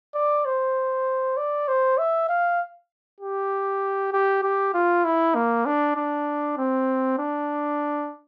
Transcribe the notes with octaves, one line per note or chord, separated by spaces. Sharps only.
D5
C5
D5
C5
E5
F5
G4
G4
G4
F4
E4
A#3
D4
D4
C4
D4